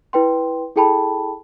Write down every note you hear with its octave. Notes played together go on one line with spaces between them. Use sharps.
E4 B4 G5 C6
E4 G#4 A4 G5 A5 B5